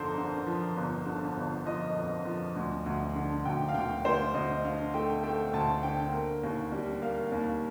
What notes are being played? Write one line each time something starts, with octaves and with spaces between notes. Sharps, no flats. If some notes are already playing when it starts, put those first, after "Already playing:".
Already playing: G1 F2 D3 F3 A4 A#4 C5
D3
F3
G1
D3
G1
F3 D#5
F2
F3
D2
D2
D3
D2 G5
F5
D2 G5
D2 C5
D2 D#5
D3 F5
A3 G5
A3 G5
D2 A5
D3 G5
A#3
D#2
G3
A#3 F5
D#2